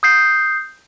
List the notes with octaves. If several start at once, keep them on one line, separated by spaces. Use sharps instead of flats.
D#6 G6 C7